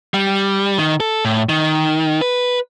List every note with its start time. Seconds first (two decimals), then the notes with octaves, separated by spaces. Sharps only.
0.14 G3
0.78 D#3
1.00 A4
1.25 A2
1.49 D#3
2.21 B4